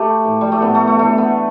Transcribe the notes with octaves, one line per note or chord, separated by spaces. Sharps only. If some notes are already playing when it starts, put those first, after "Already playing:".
Already playing: A3 G4
A2 E3
G3
A3
A2 E3 B3
A3
A3
G2 E3 A3
B3